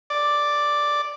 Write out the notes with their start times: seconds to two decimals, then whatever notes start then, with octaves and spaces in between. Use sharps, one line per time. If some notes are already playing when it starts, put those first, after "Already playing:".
0.10 D5